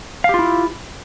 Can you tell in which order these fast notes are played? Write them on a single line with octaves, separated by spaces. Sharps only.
F5 G4 F4 E4